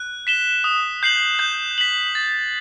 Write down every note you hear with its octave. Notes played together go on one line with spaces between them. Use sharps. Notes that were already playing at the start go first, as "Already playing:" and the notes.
Already playing: F#6
B6 E7 G7
D#6
G6 C7 F#7
G6
B6 F#7
A6